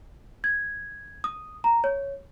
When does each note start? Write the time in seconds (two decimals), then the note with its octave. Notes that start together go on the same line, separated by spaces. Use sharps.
0.44 G#6
1.24 D#6
1.64 A#5
1.84 C#5